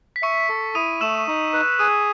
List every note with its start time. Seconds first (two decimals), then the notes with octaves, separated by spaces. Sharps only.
0.16 B6
0.22 E5 C#6 C#7
0.49 A4
0.75 E4 D#6 D#7
1.01 A3 E6 E7
1.27 D#4
1.53 B4
1.79 G#4 D#6 D#7